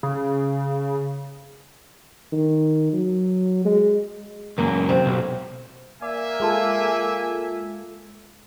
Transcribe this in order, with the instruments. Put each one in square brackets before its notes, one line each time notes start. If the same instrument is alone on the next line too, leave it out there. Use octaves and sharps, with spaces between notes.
[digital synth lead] C#3
[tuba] D#3
F#3
G#3
[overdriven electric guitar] C#2 F#2 [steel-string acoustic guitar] A#3
[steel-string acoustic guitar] D#2 C3 C4
[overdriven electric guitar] B1
[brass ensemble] A#3 E5 G#5 [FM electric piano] D5
[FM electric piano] G#3 F4 A4